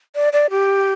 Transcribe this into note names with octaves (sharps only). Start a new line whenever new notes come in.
D5
D5
G4